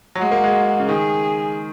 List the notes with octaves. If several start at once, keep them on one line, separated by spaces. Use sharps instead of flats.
F#3
G#3 F#4
A#3
G#3
C#3
D#3 G#4